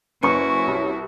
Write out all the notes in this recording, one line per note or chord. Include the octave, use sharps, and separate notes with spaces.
F#1 C#4 E4 F#4 B4 G#5 C#6 C#7
C2